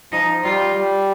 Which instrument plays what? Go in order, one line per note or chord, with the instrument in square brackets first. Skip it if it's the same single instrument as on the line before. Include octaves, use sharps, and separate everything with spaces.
[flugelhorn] F3 [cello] D#4
[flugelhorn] G3 [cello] F4
[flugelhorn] G3